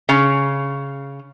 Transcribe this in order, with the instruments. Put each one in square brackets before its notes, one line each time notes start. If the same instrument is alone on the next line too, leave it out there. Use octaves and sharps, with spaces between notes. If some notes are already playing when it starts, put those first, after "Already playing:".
[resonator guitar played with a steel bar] C#3